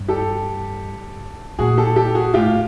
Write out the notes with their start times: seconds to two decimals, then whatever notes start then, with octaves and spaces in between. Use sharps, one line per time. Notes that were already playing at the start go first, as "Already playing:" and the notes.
Already playing: G2
0.08 G4 A4
1.59 A#2 F#4 G#4
1.77 G4 A4
1.96 G4 A4
2.15 F#4 G#4
2.34 A2 F4 G4